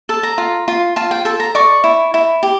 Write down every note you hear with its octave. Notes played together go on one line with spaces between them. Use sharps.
A4 A5
A#5
F4
F4
F4 A5
G5
A4 A5
A#5
D5 C#6
E4
E4
G4